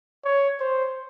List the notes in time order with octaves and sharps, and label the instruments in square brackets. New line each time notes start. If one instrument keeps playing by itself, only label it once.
[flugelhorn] C#5
C5